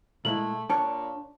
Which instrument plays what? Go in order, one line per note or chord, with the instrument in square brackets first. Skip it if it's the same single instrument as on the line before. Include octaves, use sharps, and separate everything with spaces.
[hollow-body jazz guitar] A#2 G#3 E4 [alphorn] A3 [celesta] F#7
[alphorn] A#2 [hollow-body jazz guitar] D4 C#5 [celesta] A5